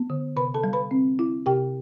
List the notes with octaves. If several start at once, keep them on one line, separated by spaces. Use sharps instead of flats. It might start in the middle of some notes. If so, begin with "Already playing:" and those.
Already playing: B3
D3
C3 B4 B5
A4 A5
G3
B4 B5
C4
E4
C3 G4 G5